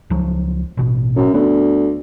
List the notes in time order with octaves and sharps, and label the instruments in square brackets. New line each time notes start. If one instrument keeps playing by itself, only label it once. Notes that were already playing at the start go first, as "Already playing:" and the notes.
[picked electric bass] C#2 F3 F#3
A1 B2
[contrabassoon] F#2
[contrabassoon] D2 [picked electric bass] B3